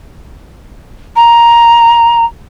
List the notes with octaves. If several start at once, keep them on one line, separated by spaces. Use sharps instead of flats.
A#5